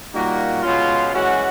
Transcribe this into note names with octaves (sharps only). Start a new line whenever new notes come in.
A#2 G3 A#3 D#4 F#4
B2 G#3 C#4 F4
E3 G#3 C#4 F#4